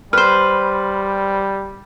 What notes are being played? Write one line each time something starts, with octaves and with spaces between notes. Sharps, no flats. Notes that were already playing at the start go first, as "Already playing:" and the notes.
G3 B4 C5 F6